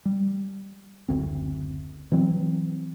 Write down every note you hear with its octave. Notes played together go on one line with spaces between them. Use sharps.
G3
F#1 D2 C4
E3 F#3 C4